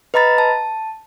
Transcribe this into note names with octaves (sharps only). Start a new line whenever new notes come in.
B4 D#5 A#5 B5 A6
A5